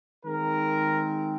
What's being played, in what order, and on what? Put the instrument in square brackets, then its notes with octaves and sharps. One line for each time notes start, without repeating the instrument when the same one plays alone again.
[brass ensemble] D#3 G#3 C4 A#4